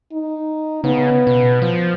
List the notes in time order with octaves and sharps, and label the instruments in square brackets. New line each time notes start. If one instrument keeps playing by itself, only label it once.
[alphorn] D#4
[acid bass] C#3 [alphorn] B3
[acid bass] B2
F3